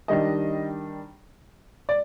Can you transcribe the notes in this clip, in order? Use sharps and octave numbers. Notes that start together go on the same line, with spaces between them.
D#3 G3 D4 D#5
D5